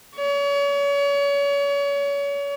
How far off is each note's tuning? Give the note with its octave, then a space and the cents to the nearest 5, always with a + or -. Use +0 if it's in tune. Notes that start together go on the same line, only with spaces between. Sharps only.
C#5 +35